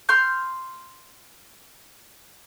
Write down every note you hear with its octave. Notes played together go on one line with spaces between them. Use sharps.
C6 F6 G6